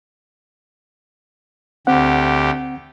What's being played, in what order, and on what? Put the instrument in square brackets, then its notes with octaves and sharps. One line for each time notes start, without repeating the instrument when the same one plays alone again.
[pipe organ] D2 G4 [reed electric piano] C4 F#5